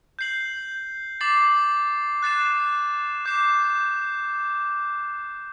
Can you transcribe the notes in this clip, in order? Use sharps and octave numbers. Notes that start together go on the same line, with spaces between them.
G6 C7 F#7
D6 A6 C7 F#7
F#6 A6 C7 E7
D6 G6 C7